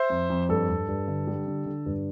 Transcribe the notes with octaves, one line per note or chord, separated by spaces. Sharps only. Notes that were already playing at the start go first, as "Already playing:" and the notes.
Already playing: C5 E5
F2
F2
G2 A4
G2
G2
D3
G3
D3
D3
G2